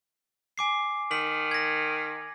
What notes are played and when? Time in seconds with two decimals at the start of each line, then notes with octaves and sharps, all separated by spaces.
0.58 G#5 D6 C7
1.11 D#3 B6 F#7
1.51 G#6 A#6